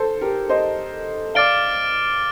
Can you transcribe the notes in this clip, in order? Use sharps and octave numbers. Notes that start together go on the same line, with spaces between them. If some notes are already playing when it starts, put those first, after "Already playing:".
Already playing: A4 C5
G4 A#4
C5 D#5
D5 F5 D6 F6 A6 D7 G7